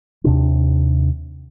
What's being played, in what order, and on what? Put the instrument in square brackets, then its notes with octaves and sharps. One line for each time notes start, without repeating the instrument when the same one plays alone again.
[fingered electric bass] D#2 C3 D4